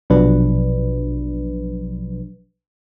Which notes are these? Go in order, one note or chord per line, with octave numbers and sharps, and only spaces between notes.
A#1 B2 F3 F#3 D4 B4